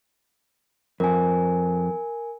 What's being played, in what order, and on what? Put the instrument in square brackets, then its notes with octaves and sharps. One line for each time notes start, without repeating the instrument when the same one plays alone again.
[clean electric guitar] F2 [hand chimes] A#4 G#5